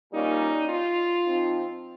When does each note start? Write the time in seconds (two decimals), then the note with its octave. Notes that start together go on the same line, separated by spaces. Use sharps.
0.12 A#2 G3 A#3 C#4 D#4
0.69 F4
1.26 F3 C4 D#4